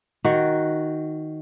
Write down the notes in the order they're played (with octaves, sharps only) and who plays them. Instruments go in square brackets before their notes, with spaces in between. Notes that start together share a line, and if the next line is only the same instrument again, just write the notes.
[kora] D#3 F#4